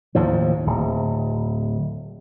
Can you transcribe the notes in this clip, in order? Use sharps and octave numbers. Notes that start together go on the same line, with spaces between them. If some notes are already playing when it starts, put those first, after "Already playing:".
D#2 A2 F3
D1